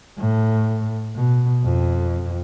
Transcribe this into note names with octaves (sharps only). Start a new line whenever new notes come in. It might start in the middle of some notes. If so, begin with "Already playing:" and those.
A2
B2
F2